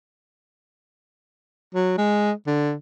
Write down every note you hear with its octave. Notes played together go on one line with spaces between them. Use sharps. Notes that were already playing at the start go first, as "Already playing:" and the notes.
F#3
G#3
D3